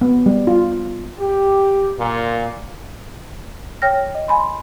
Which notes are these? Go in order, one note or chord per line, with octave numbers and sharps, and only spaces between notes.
B3
G3
F4
G4
A#2
C#5 G5 F6 A#6
D#5
G#5 B5 C6